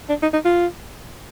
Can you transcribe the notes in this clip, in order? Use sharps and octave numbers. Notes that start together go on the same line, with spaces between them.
D4
D#4
D#4
F4